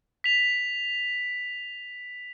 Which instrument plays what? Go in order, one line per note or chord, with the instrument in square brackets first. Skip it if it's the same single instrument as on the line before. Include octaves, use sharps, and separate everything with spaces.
[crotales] B6 F7